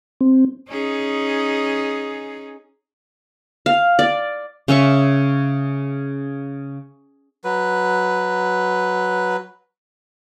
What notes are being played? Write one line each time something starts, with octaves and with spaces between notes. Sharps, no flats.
C4
C#4 D#4 G#4
F5
D5
C#3 C#4 E5 C#6
F#3 B4